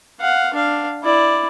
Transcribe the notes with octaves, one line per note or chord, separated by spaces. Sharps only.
F5 F#5
D4 F5
E4 D5